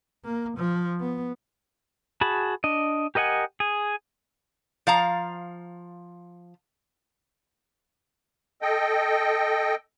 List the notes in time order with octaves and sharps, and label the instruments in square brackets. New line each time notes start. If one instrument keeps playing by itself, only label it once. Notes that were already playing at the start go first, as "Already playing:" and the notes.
[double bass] A#3
F3
B3
[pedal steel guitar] F#4 G#4 A5 B5
D4 D#5
G4 A#4 D#5 F#5 G#5
G#4
[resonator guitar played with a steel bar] F3 F5 A#5
[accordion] A4 D#5 G5